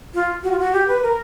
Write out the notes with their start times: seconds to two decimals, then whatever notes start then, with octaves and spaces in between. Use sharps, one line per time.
0.14 F4
0.43 F#4
0.52 F4
0.59 F#4
0.73 G4
0.88 B4
1.03 A#4